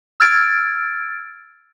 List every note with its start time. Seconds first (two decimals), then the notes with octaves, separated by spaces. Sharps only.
0.20 E6 F6 G#6 A6 D7